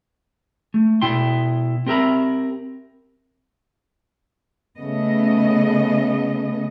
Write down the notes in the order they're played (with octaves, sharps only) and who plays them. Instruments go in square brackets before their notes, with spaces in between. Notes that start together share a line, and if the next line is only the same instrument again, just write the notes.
[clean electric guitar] A3
B2 E4 G5 C6
C4 G4 A#4 E5 A#5 B5
[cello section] C#3 A3 B3 D#5